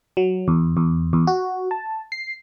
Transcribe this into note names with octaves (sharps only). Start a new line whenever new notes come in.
F#3
E2
E2
E2
F#4
A5
C7